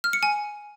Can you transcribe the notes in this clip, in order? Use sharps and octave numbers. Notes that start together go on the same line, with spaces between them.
F6
C#7
G#5